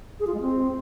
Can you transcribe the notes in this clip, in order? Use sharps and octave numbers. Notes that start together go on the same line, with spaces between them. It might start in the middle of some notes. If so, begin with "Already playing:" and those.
G#4
F4
G#3
C4